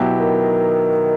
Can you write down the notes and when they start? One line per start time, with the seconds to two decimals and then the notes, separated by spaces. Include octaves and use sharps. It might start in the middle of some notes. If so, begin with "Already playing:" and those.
Already playing: B2 F#3 B3 E4 G4
0.20 D#3